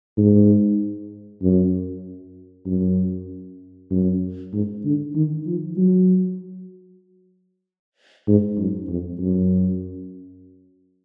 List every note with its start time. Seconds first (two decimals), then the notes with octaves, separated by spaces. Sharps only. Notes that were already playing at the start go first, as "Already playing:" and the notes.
0.17 G#2
1.42 F#2
2.66 F#2
3.91 F#2
4.53 G#2
4.85 D3
5.15 D#3
5.47 F3
5.77 F#3
8.27 G#2
8.58 F#2
8.89 F2
9.20 F#2